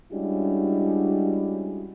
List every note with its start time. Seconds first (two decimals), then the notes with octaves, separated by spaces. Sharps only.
0.11 G3 G#3 C#4 D4 E4 F#4